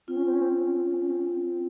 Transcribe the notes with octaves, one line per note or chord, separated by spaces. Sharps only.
C4 F4
C#4
C4
C#4
C4
C#4
C4
C#4
C4
C#4
C4
C#4
C4
C#4
C4
C#4
C4